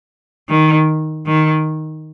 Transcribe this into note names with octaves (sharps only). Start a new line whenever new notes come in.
D#3
D#3